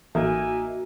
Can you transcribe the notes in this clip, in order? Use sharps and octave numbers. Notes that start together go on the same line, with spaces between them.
A1 A#3 D#4 F#4 A#4 E5 G#5